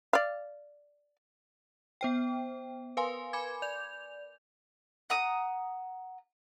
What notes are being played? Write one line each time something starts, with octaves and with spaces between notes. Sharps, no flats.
D5 F5
B3 C5 G5
A#4 B4 F5 G#5 C6
G#5 B5 D6 G#6
D5 G6 F7
F#5 A#5 D#6